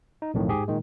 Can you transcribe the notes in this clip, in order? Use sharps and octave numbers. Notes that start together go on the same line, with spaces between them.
D#4
B1 F2 A2 D#3
G#2 G4 G#4
A#2 D#3 G#3